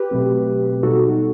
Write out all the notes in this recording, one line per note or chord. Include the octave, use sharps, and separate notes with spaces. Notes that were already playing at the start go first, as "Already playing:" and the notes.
Already playing: G4 B4
B2 F#3 A3 C4
B2 G3 B3 D#4 F#4 A4